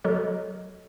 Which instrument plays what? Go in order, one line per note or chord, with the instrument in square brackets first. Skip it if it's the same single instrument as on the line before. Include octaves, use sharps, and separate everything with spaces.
[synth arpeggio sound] F#3 F#4 A4 A#4 C#5 D#5